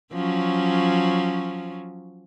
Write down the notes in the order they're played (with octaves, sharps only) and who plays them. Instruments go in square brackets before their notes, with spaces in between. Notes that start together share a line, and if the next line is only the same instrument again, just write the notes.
[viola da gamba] F3 F#3 C#4